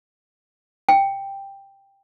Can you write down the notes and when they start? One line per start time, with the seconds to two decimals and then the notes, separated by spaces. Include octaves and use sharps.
0.89 G5